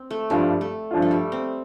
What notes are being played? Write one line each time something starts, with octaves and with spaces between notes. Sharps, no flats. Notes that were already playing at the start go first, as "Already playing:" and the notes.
Already playing: C4
A3
G2 F3 G3 D4 F4
A3
G2 F3 D4 F4
A3
G3
C4